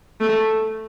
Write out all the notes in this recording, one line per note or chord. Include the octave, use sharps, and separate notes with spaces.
A3